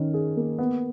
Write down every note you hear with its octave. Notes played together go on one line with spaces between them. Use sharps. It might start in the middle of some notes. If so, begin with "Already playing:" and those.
Already playing: D#3 C#4
G#4
A#3
B3